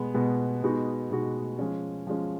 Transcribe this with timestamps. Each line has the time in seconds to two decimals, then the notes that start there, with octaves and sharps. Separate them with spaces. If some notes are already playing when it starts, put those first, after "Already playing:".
Already playing: B2 G#3 B3
0.14 B2 G#3 B3
0.63 B2 G#3 B3 D#4 F#4
1.11 B2 G#3 B3 D#4 F#4
1.59 F3 G#3 C#4
2.07 F3 G#3 C#4